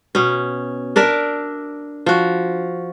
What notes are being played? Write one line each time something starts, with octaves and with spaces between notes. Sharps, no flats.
B2 C#4
D4 A#4 D5 E5
F3 F#4